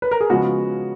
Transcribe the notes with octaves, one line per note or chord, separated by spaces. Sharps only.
B4
A#4
G#4
C#3 F3 G#3 B3 F#4